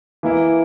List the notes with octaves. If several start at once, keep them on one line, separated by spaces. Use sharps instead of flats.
E3 A#3 E4